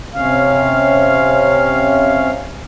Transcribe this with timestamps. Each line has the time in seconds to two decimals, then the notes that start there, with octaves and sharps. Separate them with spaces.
0.14 C3 C#4 F5